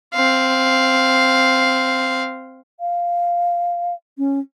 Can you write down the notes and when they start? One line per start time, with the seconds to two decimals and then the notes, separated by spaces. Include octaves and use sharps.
0.14 C4 F5
2.80 F5
4.18 C#4